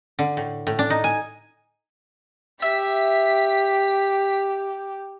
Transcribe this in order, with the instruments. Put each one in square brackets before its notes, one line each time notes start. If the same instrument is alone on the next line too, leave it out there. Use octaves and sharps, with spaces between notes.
[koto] D3
A2
A2
D4
D#4
G#5
[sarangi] G4 [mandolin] E5 [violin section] B6